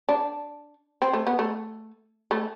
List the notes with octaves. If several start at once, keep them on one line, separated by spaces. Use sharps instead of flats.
D4
C4
A3
B3
A3
A3